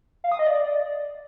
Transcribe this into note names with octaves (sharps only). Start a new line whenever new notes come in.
F5
D#6
D#5
D5